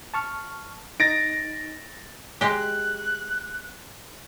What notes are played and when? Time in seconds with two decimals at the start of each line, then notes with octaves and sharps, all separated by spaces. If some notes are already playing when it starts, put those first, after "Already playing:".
0.14 A5 C#6 F6
1.00 D#4 A6 A#6 D7
2.41 G#3 G4 F#6